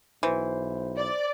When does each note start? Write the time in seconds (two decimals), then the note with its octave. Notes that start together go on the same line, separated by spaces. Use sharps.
0.23 B1 E3 C5
0.96 D5